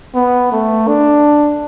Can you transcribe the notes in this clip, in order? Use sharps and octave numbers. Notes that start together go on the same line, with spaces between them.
B3
A3
D4